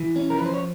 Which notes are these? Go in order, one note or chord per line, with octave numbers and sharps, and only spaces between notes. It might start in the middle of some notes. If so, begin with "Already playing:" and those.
Already playing: E3
C#4
A#4
F3 B4
C5
C#5